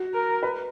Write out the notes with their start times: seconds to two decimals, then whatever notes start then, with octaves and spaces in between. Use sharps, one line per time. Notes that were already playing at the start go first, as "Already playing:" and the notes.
Already playing: F#4
0.14 A#4
0.43 B4